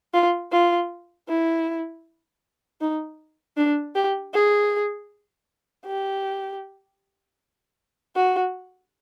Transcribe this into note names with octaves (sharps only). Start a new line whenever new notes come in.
F4
F4
E4
D#4
D4
G4
G#4
G4
F#4